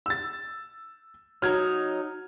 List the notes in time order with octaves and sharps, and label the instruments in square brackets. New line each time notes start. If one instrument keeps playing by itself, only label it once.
[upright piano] E6 A6
[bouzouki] F#3 D#4 [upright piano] F6 G#6